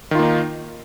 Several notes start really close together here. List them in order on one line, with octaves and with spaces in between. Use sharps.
D#3 F4 A#3 D#4